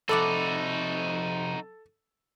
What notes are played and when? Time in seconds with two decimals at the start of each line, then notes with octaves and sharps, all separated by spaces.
0.09 F2 C3 D#4 F#4 A4 B4 D5 F#5